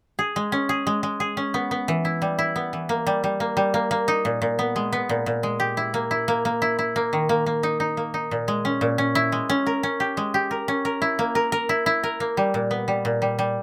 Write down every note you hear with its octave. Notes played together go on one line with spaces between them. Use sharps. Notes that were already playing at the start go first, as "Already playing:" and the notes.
G#4
G#3
C#4
G#4
G#3
G#3
G#4
C#4
B3
B3
E3
E4
G3
E4
B3
E3
A#3
G3
G3
A#3
G3
A#3
A#3
D#4
A#2
A#2
B3
G#3
B3
A#2
A#2
G#3
G4
E4
A#3
E4
A#3
A#3
E4
E4
A#3
D#3
A#3
A#3
D#4
D#4
A#3
D#4
A#2
G#3
C#4
A#2
C#4
E4
G#3
C#4
A#4
C#4
G4
G#3
G4
A#4
C#4
A#4
E4
A#3
A#4
A#4
E4
E4
A#4
A#3
G3
A#2
B3
G3
A#2
G3
G3